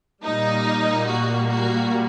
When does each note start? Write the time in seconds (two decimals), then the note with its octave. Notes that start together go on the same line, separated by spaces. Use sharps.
0.24 A#2 G3 A#3 D#4
1.08 F#4
1.49 F#4